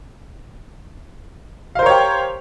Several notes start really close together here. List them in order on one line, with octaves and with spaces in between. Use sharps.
F5 C5 A#4 C#5 G4